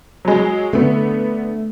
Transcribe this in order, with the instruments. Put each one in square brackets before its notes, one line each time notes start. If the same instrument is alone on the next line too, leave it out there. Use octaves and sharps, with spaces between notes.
[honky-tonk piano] F#3 G#3
[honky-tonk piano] D3 B3 [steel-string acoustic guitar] A3